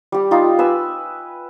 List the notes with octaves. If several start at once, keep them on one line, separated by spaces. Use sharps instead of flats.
G3 G4
G3 D#4 F4 G4
B4 G#5 E6